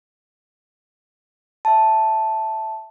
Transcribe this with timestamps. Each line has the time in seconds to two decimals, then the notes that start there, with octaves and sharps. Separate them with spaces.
1.65 E5 A5